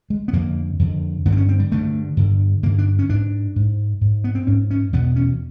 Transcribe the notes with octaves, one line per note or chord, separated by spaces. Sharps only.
G#3
B3
F2 D3 A#3
F2 D3
G2 D3 B3
C4
C#4
C4
G3
G2 D3 A3
G2 D3
G2 D3 A#3
D4
C#4
G#2 D4
G#2
G#2
B3
C4
G#2 C#4
C#4
E2 B2 B3
C#4